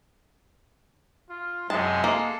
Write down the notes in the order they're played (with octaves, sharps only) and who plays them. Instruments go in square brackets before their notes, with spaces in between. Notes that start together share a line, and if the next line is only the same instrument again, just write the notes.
[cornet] F4
[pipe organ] F#2 C3 [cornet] G#3 [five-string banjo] A5
[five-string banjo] A#3 [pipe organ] A4